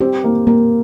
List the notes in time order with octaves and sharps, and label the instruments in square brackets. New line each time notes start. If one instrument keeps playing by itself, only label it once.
[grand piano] C4 [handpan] G4
[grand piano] A#3
[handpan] A#3 [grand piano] A#4